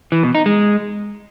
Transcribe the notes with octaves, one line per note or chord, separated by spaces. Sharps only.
E3
B2
D#4
G#3